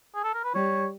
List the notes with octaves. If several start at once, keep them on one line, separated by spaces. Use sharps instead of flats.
G#4
A4
A#4
B4
G3 C#5